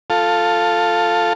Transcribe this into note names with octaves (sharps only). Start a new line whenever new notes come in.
F4 A4